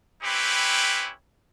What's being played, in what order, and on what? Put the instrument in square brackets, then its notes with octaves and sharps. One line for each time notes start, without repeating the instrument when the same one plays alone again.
[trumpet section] C4 C#4 E4 G4 B4